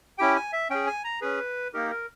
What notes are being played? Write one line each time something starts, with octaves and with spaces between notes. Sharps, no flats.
C#4 E4 G4 G5
G#5
E5
C#4 G#4 G5
G#5
A#5
C#4 G#4 B4
A#3 D#4 G4 A#4
A#4